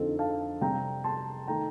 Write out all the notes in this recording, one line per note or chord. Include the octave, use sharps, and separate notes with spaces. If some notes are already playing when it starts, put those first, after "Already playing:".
Already playing: F2 D3 F3 C4 D#4 A4 C5
F5 A5
C3 G3 C4 G5 A#5
A5 C6
D#3 A3 D#4 G5 A#5